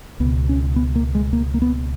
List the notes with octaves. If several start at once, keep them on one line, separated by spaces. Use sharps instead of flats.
C#2 B2 B3
C#4
B3
A#3
G#3
A#3
A#3
B3